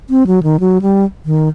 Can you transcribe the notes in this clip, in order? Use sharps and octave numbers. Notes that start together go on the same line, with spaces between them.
C4
F#3
D#3
F#3
G3
D#3